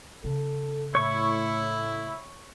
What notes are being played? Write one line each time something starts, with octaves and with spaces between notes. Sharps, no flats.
C#3 A4
A2 E4 C#5 C#6